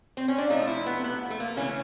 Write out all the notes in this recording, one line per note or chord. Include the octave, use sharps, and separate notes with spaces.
C4
C#4
D4
C3 F3 A3 D#4
E4
B3
B3
A3
A#3
C#3 E3 A3 C#4